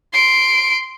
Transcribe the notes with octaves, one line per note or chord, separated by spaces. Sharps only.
C6 D7